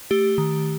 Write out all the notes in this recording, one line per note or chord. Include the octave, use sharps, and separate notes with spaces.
A3 G4
D#3